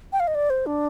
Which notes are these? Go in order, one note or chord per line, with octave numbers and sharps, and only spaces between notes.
G5
F5
D#5
D5
C5
D4